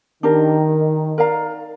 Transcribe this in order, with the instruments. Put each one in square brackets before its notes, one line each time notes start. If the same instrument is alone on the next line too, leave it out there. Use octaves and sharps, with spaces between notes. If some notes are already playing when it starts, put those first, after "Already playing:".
[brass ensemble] D#3 [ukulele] D4 G4 A#4
[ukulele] A#4 D5 F5 A#5